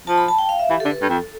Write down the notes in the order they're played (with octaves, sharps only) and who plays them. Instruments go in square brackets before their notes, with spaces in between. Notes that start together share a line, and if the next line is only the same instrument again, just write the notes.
[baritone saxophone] F3 [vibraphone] A5
[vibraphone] B5
A5
G5
F5
E5
[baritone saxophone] E3 [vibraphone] G4
[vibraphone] A4
[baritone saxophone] D3
[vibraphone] B4
[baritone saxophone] G2 [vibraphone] A4
[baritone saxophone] F2